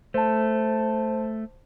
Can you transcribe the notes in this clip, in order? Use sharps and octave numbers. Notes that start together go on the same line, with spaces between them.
A3 C5 A5